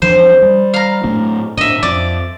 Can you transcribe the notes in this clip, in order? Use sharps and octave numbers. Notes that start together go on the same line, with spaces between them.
E2 F3 D4 C5
G3
F5 A#5
A2 A3 D4
A2 D4 D#5 E5
F2 D5